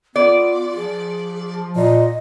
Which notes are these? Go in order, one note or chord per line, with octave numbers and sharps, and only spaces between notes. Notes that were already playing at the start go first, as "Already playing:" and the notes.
B3 F4 D5
F3 G#4
A#2 D#5